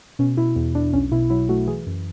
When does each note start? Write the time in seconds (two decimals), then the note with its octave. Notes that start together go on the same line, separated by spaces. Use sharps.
0.19 B2 C#4
0.37 B2 E4
0.56 E2
0.75 E2 D4
0.93 B1 C#4
1.12 B2 E4
1.30 F#3 E4
1.49 A3 F#4
1.67 E3 G#4
1.86 F#2